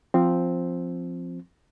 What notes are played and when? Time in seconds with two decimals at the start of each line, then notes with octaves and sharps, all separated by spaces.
0.14 F3 C4